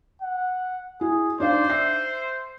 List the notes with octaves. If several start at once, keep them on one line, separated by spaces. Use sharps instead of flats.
F#5
E4 G#4
D4 D#4 C5 D5 F5
E5 C7